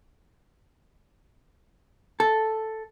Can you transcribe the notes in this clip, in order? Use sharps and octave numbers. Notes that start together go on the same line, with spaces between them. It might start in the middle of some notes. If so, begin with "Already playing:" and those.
A4